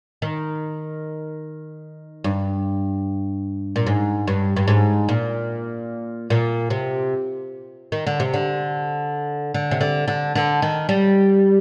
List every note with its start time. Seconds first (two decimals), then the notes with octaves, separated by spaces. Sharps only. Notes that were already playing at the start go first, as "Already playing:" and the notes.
0.22 D#3
2.24 G2
3.76 A#2
3.87 G#2
4.28 G2
4.56 G2
4.68 G#2
5.09 A#2
6.30 A#2
6.70 C3
7.92 D#3
8.07 D3
8.20 C3
8.34 D3
9.54 D3
9.71 C3
9.81 D3
10.08 D3
10.35 D3
10.62 D#3
10.89 G3